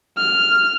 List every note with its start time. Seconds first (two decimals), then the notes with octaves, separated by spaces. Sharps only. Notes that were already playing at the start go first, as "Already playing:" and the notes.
0.18 F6